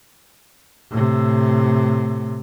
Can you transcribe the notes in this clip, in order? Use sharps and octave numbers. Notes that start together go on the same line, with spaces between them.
A2 C3